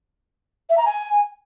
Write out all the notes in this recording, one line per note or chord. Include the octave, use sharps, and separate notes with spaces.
E5
A#5
G#5